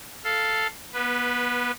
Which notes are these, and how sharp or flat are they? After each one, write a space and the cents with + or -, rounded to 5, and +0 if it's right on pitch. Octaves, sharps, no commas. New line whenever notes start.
A4 +0 F5 +0
B3 -25 B4 +0